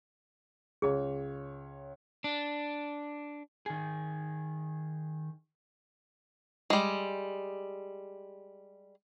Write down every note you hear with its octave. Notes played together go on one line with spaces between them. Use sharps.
C#2 G#4 C#5
D4
D#3 G#4
G3 G#3